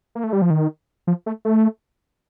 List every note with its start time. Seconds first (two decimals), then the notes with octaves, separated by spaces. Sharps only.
0.15 A#3
0.24 A3
0.33 G3
0.42 F3
0.50 D#3
1.07 F3
1.26 A3
1.45 A3